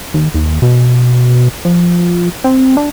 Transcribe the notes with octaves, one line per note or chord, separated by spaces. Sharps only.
D#2
D#2
B2
F3
C4
D4